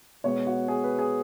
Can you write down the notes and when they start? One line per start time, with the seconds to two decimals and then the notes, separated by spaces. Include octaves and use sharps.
0.24 B2 G#3 B3 C#5
0.47 F#4
0.68 G#4
0.84 B4
0.99 G#4